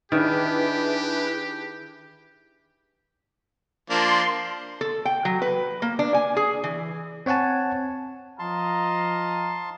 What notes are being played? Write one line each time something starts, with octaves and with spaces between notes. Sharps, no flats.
D#3 D4 E4 G4 G#4 B4
F3 A#3 D4 C6
A4
G5
F#3
B4
A#3
D4
G#5
G#4
E3
C4 C#5 F#5 G#5 A5
F3 D#5 F5 A5 A#5 C6